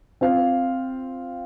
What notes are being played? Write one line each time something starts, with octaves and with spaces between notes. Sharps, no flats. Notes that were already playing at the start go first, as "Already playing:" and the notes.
C4 F4 C5 F5